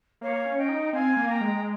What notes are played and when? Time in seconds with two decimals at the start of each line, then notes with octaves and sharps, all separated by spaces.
0.21 A#3 C#5 F5
0.45 C#4
0.57 D#5 G5
0.69 D#4
0.93 C4 F5 G#5
1.17 A#3
1.29 G5 A#5
1.41 G#3